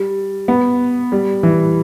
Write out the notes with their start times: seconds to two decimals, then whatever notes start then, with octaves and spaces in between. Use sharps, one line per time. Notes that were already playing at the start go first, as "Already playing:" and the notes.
Already playing: G3
0.48 B3
1.12 G3
1.43 E3